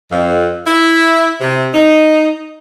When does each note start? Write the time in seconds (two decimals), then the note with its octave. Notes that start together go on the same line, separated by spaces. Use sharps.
0.12 F2
0.67 E4
1.41 C3
1.74 D#4